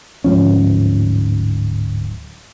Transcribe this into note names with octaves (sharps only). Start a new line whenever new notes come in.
D1 G#2 F3 C#4